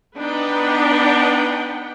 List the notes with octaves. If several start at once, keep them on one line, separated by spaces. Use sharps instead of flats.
B3 D4 D#4 B4 F#5 G5